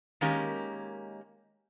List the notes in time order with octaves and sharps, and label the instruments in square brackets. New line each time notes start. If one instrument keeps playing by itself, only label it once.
[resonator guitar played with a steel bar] D#3 G#3 A#3 C#4 G4